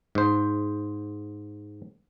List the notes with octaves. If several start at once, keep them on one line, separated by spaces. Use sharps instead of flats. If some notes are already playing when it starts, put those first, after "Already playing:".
G#2 C5